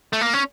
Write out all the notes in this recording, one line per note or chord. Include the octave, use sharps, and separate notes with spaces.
A3
A#3
C#4